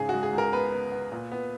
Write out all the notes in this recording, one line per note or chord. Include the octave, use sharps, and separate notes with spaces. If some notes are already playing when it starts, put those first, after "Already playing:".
Already playing: G#2 C#3 G#4
G#3 F#4
G#4
C#2
A#4
B3 B4
B3
B3
A#2
B3